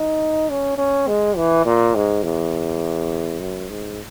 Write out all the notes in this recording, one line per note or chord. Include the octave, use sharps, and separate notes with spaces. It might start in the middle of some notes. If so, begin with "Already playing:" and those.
Already playing: D#4
C#4
C#4
G#3
E3
A#2
G#2
E2
F#2
G#2